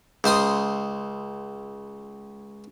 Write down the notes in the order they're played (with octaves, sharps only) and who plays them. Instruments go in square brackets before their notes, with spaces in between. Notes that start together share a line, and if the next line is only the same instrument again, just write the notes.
[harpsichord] C#2 C5 C6 D#6